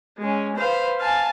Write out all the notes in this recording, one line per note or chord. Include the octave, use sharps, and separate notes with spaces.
G#3 C#4
B4 C5 F5
F5 G#5 A5